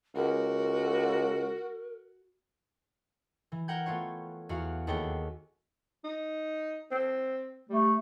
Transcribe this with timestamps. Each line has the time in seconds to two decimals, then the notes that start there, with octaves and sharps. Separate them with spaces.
0.16 C#2 F#4 A#4
3.52 E3
3.68 A#4 F#5 G5 G6 G#6
3.86 A3 B3 F4 C#5
4.49 E2 F#4 F5
4.87 D#2 F#4 G#4 A4 C#5 G5
6.05 D#4
6.91 C4
7.70 G3 A3